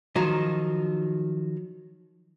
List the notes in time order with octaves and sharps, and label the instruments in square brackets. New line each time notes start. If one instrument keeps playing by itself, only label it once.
[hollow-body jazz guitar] D#3 F3 F#3 D#4